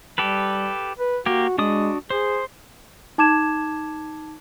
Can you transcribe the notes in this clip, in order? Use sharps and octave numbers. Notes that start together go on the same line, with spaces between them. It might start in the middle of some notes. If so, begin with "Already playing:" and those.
G3 G4 A4 B4
B4
A#3 F#4 G4
G#3 D4 F#4 D#6
G#4 C5
D#4 A5 D6 G#6 E7